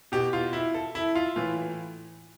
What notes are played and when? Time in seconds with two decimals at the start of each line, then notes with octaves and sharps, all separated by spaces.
0.12 B2 G4
0.33 F4
0.53 E4
0.74 A4
0.95 E4
1.15 F4
1.36 A2 E3 F4